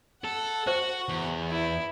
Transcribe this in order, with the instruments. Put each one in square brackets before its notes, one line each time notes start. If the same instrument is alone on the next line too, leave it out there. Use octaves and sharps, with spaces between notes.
[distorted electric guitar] A4 [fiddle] F#5
[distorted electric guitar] F#4 [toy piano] C5 G5
[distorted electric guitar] E2
[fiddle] E4